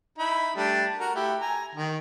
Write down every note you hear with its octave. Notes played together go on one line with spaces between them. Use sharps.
D#4 E4 B5
G3 A3 D4
F#4 A#4
A3 E4 G4
G#5 A#5
D#3